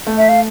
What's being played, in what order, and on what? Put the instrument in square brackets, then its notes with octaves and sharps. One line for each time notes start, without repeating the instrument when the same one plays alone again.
[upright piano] A3
[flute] E5
F5